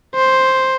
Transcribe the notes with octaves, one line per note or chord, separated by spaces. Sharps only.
C5